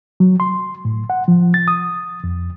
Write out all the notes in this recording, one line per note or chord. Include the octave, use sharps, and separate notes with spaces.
F#3
C6
A2
F#5
F3
A6
D#6
F2